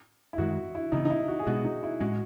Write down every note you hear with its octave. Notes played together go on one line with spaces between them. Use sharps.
E4
F#2 D#3 G#3 F#4
E4
C#3 E3 B3 D#4
D#4
E4
F#4
G#4
B2 G#3 B3 F#4
D#4
E4
A2 G#3 C#4 F#4